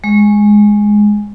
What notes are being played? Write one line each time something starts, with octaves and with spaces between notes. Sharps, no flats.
G#3